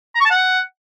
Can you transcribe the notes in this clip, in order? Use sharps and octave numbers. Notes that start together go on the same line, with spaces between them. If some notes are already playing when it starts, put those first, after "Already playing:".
A#5
C#6
A5
F#5